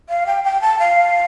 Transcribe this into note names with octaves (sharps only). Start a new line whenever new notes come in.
F5
G5
G5
A5
F5